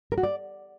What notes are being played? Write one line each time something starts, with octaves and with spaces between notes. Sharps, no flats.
A#4
F#4
D5